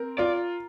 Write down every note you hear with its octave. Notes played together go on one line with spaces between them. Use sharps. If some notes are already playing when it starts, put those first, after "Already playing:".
Already playing: C4 A#4
F4 D5